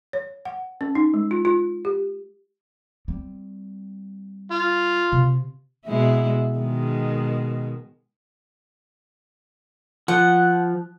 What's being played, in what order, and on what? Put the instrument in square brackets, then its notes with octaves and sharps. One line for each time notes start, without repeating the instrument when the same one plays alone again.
[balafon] C#5
F#5
C#4
D#4
G#3
F4
F4
G4
[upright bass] G3 C4
[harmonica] F4
[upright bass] C3
[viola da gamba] B2 G#3 E4
B2 D#3 G#3
[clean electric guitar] F3 [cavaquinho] F#5